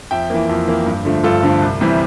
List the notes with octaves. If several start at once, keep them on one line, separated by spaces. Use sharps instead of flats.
F2 E5 G5
E3 A#3
F2
E3 A#3
G2
D3 F3 A3
G2 F4 A4
D3 F3 A3
C2
C3 E3 G3